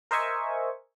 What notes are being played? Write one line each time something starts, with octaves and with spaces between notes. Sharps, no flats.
A#4 C5 D#5 E5 G#5 C#6